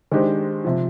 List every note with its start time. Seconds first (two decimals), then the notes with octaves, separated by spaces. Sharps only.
0.12 D#3 G#3 D4 G4 C5
0.65 C3 F3